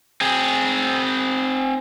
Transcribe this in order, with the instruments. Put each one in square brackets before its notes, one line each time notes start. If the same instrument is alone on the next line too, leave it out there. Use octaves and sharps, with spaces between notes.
[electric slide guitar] C4 G#4